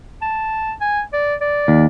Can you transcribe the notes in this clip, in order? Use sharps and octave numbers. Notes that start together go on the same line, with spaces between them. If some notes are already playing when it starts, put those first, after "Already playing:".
A5
G#5
D5
D5
D#2